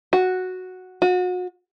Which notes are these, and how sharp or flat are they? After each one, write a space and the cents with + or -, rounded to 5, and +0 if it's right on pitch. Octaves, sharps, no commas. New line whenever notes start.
F#4 -5
F#4 -35